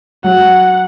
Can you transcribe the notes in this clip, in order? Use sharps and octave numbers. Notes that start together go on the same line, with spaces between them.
F#3 F#5